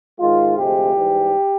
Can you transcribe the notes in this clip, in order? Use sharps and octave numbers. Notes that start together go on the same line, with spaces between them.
G#2 D#3 G#3 F4
D2 C3 F3 G#3 G4
G#2 E3 G3